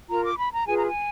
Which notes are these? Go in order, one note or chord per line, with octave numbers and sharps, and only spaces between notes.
F4 A#4 A#5
D6
B5
A#5
F4 G#4 B4 G#5
A#5
G#5